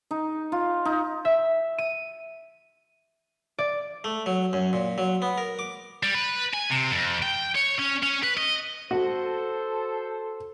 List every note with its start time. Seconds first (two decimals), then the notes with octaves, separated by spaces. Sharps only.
0.11 D#4
0.52 F4
0.85 D#4
1.25 E5
1.78 D#7
3.58 D5
4.04 A3
4.26 F#3
4.53 F#2
4.73 A#2
4.98 F#3
5.22 B3
5.38 A#4
5.59 D6
6.03 G3
6.15 B4
6.54 G#5
6.70 C3
6.91 F2
7.22 G5
7.55 C#5
7.78 C#4
8.03 C#4
8.23 B4
8.37 D#5
8.91 F#4 A4 C5